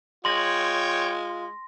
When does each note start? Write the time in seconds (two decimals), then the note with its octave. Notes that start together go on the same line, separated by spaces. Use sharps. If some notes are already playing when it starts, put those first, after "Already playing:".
0.25 G#3 F4 C#5 G5 C6 A#6